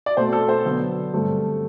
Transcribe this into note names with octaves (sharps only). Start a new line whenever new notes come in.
D5
B2 A3 C4 C5
A4
C5
D3 F#3 B3 D4
G2 D3 A3 C4